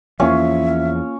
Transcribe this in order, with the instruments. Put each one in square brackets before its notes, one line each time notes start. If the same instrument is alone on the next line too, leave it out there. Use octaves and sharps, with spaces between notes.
[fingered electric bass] E2 E3 F3 [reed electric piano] A#3 F4 F5 [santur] C#4 [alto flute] E5